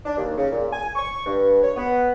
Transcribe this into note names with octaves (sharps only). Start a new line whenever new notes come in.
D4
D#2
C#3
A#2
G#5
C#6
G2
C#5
B3